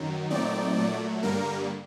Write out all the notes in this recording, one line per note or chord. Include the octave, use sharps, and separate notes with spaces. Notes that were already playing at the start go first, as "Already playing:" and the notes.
Already playing: F#2 D#3 F#3
A#2 F#3 A3 C4 D#4 D5
A#2 F#3 A3
G2 D3 G3 A#3 A#4